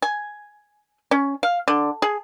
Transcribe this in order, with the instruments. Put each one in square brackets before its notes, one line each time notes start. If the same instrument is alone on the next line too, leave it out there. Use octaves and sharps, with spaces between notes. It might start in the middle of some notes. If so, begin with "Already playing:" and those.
[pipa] G#5
C#4
F5
D3
G#4